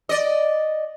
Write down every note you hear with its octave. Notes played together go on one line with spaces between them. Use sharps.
D5 D#5